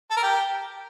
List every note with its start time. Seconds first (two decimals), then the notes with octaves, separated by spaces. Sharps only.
0.11 A4
0.17 A#4
0.23 G4